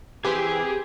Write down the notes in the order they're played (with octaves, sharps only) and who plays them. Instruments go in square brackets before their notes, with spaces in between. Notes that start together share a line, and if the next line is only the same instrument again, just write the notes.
[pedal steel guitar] E3 C4 E4 [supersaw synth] G4 [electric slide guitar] G#4 [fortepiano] B4 C5